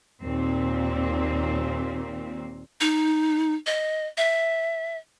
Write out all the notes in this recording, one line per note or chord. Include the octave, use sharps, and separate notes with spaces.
D#2 A#2 A#3 C4
D#4
D#5
E5